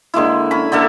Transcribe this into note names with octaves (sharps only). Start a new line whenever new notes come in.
D3 G#3 A#3 E4
C#4 A#5 B5
D3 A#3 A4 E5